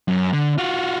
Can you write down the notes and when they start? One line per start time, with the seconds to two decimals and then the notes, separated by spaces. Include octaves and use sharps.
0.08 F#2
0.33 D3
0.58 F4 F#4